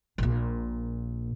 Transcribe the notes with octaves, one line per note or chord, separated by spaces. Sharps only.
A#1 A#2